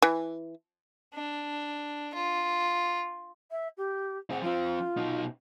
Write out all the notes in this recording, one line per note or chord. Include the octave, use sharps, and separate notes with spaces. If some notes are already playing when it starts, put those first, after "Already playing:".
E3
D4
F4
E5
G4
C4 G#4 F#5
F3 C4 F4
B2 D#4